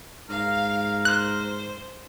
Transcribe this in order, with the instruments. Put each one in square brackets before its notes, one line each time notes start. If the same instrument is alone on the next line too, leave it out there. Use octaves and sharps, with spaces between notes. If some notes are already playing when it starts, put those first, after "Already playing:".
[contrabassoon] G#2 [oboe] A#4 [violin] F5
[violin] C5 [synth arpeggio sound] F#6